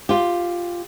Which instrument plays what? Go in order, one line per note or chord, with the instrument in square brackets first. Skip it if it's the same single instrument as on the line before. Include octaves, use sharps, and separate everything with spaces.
[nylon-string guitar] F4 G4